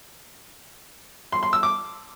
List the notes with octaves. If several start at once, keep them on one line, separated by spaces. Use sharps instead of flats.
C6
C6
E6
D6